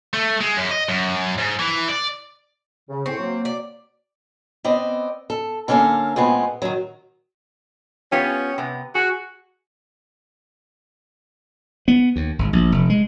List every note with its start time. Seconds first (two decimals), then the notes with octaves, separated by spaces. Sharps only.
0.13 A3
0.41 G#3
0.57 F#2
0.71 D#5
0.89 F#2
1.38 G#2
1.59 E3
1.89 D5
2.89 C#3
3.06 A2 C4 C#6
3.18 F#3 A#3
3.45 D5
4.64 B3 C4 D5 D#5
5.30 A4
5.68 D3 A#3 C#4 A4 A#4 F5
6.16 A#2 G#3 B3 C4
6.62 D#3 F#3
8.12 B3 C#4 F4 G4
8.58 C3 B3
8.95 F#4 G#4
11.88 B3
12.16 D#2
12.39 G#1
12.53 A#1
12.72 F1
12.90 G#3